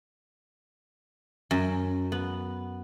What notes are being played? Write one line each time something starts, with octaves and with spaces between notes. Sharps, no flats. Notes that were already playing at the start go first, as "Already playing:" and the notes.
F#2
B3